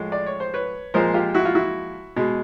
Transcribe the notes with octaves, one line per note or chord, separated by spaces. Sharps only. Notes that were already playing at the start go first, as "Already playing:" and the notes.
Already playing: A2 F3 G#3
D5
C#5
C5
B4 C#5
A#2 F3 G#3 A#4 C5
F4 G4
E4 F#4
F4
E4 F#4
B2 G#3